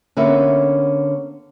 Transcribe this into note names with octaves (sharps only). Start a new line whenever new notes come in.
D3 A#3 B3 C#4 E5